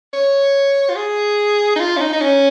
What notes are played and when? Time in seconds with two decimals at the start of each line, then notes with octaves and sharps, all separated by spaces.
0.13 C#5
0.89 F4
0.96 G#4
1.76 D#4
1.80 F4
1.97 C#4
2.00 D#4
2.13 D#4
2.21 C#4